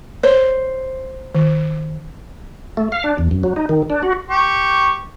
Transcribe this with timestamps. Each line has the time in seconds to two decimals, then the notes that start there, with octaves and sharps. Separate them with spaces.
0.23 C5 C#5
1.35 D#3
2.77 A3
2.92 F5
3.04 D4
3.18 E2
3.31 F#2
3.43 F#3
3.56 D#4
3.69 D#3
3.90 D4
4.03 F#4
4.30 G4 C#6